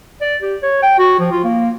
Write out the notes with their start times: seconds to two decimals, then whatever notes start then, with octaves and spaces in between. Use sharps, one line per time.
0.21 D5
0.42 G4
0.63 C#5
0.83 G5
0.98 F#4
1.20 F3
1.32 F4
1.44 A#3